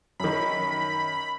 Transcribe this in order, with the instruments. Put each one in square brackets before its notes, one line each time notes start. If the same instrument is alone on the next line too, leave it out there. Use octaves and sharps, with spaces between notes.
[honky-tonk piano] F#2 D#3 [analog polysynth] B5